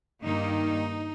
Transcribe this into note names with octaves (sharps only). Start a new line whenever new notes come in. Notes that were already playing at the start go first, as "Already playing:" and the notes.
G2 D#3 A#3 D#4